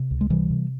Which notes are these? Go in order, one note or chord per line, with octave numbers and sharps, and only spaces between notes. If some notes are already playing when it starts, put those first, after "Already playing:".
Already playing: C3
C#2
G#3
C3 E3 G3
C3